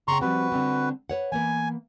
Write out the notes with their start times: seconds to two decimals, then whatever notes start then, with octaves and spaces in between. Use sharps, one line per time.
0.08 C#3 B3 G5 A#5 C6 C#6
0.21 F3 G3 C4 F#4 B4
0.52 D3 G3 C4
1.10 B4 C#5 F#5
1.32 E3 A#3 B3 G#5